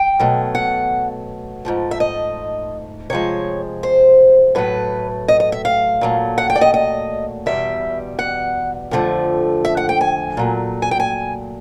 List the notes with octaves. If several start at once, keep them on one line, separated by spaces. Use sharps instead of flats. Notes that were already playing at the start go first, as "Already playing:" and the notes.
Already playing: G5
B2 F#3 A3
F#5
G#2 F3 A3
E5
D#5
C3 F3 G#3 C#5
C5
A2 F#3 A3 B4
D#5
D#5
E5
F5
A#2 F#3 A3
F#5
G5
D5
D#5
D#5
E2 B2 G3 E5
F#5
F2 D3 F3 A3
E5
F#5
G5
G#5
A#2 F#3 A3
G#5
G5
G#5